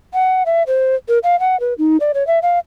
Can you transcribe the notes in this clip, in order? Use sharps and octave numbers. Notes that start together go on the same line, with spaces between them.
F#5
E5
C5
A#4
F5
F#5
B4
D#4
D5
C#5
E5
F5